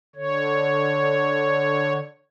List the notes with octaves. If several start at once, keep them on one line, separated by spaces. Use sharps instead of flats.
D3 C#5